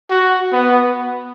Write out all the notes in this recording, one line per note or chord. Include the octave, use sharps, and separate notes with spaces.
F#4
B3